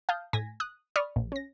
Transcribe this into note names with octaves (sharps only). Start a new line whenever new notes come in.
F5 A5 D#6 F6 G6
A2 G#5 G#6 A#6 B6
D#6 F#6
D5 B5 C#6 D#6 F6
A#1
C#4 A#6